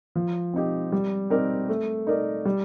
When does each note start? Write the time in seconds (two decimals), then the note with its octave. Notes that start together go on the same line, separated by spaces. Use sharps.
0.16 F3
0.54 C4 D#4 G4
0.92 G3
1.30 C4 D#4 A#4 D5
1.69 A3
2.07 D#4 A#4 D5
2.46 G3